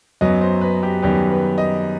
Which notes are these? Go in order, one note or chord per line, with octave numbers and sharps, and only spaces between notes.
F#2 F#3 B3 D#5
C5
B4
G4
F#2 D#3 G3 B3 G4
B4
D#5